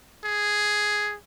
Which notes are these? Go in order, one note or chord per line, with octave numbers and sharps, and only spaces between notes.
G#4